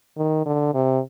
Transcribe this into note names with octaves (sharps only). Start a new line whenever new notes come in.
D#3
D3
C3